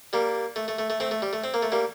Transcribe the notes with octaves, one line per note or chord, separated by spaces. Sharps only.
G3 A#3
A3
A3
A3
A3
A3 C4
A3
G3
A3
C4
A#3
A3
G3 A#3